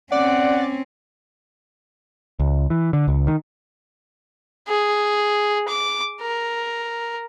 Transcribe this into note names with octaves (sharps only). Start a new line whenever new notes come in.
C4 C#4 D5 F#5
C#2
E3
D3
C#2
D#3
G#4
D6
A#4